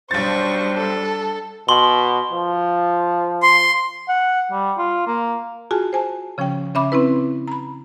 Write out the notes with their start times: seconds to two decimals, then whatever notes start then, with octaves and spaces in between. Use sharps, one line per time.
0.11 B1 G3 D4 C5 C#6 A6
0.77 A4
1.69 B2 C6 G7
2.31 F3
3.43 C6
4.09 F#5
4.52 G3
4.78 F4
5.07 A#3
5.71 F4 F#4 G#4 G#5 A5
5.93 C5 G#5 A5
6.38 C#3 F3 C#4 C#5 G5
6.75 C#3 C#4 E5 B5 D6
6.92 C4 C#4 E4 B4
7.48 A#5 B5